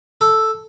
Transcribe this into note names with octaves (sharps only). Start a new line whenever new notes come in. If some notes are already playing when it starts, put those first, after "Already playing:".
A4